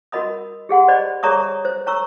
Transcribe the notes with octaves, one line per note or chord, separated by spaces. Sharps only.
F#4 A#4 D#5 B5 D#6
G4 G#4 F#5 C6
C5 D5 D#5 B5
G#4 C#5 D5 A#5 C#6 D#6
C5
C#5 A#5 C#6 E6